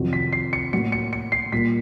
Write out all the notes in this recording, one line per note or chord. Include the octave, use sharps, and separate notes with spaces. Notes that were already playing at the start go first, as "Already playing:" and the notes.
Already playing: F2 C3 D#3 F#3
B6
C7
C#7
A2 F#3 A#3 C#7
C#7
C#7
C7
A#2 G3 A#3 B6